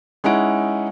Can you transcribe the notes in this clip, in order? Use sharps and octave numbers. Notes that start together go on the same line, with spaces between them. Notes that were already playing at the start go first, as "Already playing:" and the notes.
G#3 C#4 D#4 E4 F#5 D7